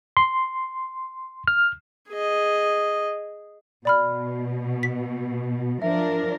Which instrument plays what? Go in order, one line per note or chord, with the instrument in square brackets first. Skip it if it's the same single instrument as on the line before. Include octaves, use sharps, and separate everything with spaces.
[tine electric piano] C6
F6
[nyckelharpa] G#4 D#5
[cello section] B2 [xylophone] D5 B5 F6
[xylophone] B6
[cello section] F3 D4 A#4 [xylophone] E5